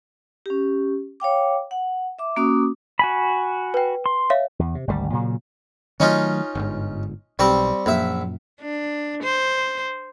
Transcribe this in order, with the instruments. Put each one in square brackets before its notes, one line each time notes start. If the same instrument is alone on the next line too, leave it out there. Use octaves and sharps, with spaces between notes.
[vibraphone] C#4 G4
C#5 F5 G5 D6
F#5
E5 D6
A#3 C#4 F#4 D6 D#6
[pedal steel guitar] F#4 G#5 B5
[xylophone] B4 G5
[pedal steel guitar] C6
[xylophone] C#5 E5 F5
[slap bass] E2
C3
G#1 D2 C3 G3
A#2 C#3 F#3
[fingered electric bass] D#3 F#3 A3 [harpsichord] C#4 D#4 F4
[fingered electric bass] G1 G#2
[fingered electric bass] B1 [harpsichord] G3 C4 C#6
[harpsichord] A#1 E5 [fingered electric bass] F#2 A#2
[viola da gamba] D4
C5